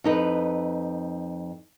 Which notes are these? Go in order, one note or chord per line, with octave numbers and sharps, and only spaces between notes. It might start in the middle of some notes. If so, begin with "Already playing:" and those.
F2 D#4 B4